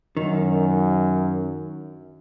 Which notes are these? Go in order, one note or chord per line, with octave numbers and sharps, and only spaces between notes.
F#2 D#3